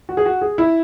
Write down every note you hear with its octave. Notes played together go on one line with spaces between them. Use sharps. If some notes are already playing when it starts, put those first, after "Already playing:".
F#4
G#4
F#4
G#4
E4